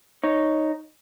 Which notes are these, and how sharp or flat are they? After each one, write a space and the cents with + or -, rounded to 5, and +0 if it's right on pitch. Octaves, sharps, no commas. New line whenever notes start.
D#4 +0 C#5 +0